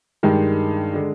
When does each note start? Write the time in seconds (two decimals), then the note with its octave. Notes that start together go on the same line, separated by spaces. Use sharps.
0.23 G2 D#3 G#3
0.94 D3 G#3